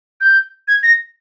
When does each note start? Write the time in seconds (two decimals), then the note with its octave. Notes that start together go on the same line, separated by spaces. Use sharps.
0.21 G6
0.68 G#6
0.83 A#6